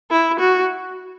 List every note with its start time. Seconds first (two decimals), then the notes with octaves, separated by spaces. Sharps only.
0.11 E4
0.40 F#4